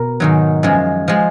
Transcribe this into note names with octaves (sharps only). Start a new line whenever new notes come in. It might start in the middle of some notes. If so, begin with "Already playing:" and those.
Already playing: B2 A#4
G#2 D#3 F#3
F#2 F3 G#3
F3 G#3